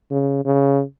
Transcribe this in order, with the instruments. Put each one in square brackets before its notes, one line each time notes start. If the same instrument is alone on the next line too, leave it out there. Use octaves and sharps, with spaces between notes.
[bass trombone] C#3
C#3